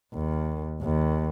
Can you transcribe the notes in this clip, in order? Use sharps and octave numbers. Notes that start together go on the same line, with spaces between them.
D#2
D#2